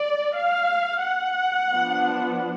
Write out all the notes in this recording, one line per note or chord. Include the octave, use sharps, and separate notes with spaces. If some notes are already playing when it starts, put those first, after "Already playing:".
Already playing: D5
F5
F#5
F3 B3 D4